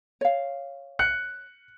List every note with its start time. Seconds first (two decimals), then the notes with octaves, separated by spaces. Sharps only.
0.21 C#5 F5
0.99 F#6 C#7